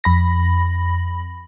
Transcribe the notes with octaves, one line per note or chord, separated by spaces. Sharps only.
F2 B5 A#6